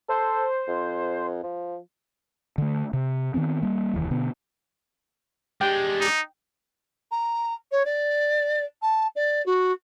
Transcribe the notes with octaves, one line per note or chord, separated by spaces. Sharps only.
A4 C5
F2
F3
D3 A3
C3
D#3 F3 B3 C4
G3 A#3
F1 D#2 E3
B2 D3 B3
G#3 D4 G4 G5
D#4
A#5
C#5
D5
A5
D5
F#4